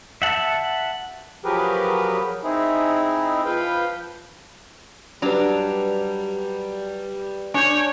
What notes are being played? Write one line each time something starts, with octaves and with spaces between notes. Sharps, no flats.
E5 F#5 A5
F3 F#3 G4 G#4 A#4 B4
C4 D#4 E4 G#4
F3 B4 F5 G5
F#3 G3 D4 B4 F7
D4 C#5 G#5 G6